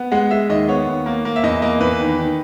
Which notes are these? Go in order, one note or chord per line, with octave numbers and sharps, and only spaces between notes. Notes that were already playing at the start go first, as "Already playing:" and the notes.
Already playing: B3
G#3 F#5
G#3 E5
D#2 D#5
B3 C#5
D#2
A#3
A#3
E5
E2 D#5
A#3 D#5
E2 B4
D#3
D#3